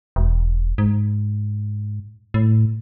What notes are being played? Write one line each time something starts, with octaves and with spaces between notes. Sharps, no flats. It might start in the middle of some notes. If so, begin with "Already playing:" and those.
E1
G#2
A2